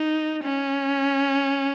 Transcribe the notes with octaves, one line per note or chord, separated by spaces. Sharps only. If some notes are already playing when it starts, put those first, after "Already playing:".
Already playing: D#4
C#4